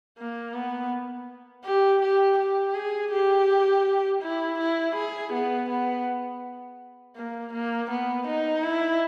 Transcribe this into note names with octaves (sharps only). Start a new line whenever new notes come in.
A#3
B3
G4
G4
G4
G#4
G4
E4
E4
G#4
B3
B3
A#3
A#3
B3
D#4
E4